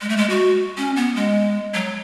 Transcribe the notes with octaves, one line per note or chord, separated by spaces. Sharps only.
G#3
A3
G#3
F#4
C#4
B3
G#3
F#3